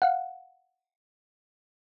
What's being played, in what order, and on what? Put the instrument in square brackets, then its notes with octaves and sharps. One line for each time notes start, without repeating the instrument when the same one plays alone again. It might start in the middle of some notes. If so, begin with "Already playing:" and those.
[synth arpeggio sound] F5 F#5